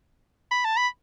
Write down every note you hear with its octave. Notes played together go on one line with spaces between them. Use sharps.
B5
A5
B5